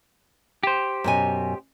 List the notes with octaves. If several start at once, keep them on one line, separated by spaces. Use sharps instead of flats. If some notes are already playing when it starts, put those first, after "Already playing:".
G4 C5
F#2 B2 G#5